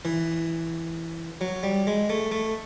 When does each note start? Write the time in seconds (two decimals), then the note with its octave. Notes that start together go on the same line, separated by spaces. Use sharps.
0.05 E3
1.41 F#3
1.63 G3
1.87 G#3
2.10 A3
2.32 A3